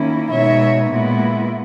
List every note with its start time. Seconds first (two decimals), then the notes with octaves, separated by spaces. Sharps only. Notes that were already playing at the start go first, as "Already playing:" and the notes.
Already playing: D#3 A#3 C#4 E4
0.30 B2 G#3 D#4 C#5 E5
0.89 A#2 G#3 B3 E4